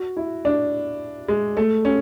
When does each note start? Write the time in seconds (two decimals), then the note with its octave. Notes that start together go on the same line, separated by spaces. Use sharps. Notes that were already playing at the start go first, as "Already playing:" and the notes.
Already playing: F#4
0.17 E4
0.45 D4
1.28 G#3
1.57 A3
1.85 C#4